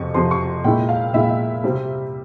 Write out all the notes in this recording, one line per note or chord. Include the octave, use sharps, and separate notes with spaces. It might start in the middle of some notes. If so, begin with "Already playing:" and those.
Already playing: F2 C3 F3 C#6
F2 C3 F3 C6
C#6
A#2 G#3 E4 G5
F5
A#2 G#3 E4 E5
C3 G3 C4